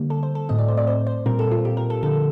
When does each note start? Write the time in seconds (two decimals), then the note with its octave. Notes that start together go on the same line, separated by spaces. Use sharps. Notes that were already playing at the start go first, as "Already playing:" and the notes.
Already playing: D3 G3 A#3
0.10 A4
0.23 C5
0.35 A4
0.49 A2 A3 C4 D#5
0.58 D5
0.68 C5
0.77 D5
0.87 C5
1.07 C5
1.26 A#2 G3 C4 A#4
1.39 A4
1.51 F4
1.65 G4
1.77 A#4
1.90 A4
2.03 D3 F3 A3 A4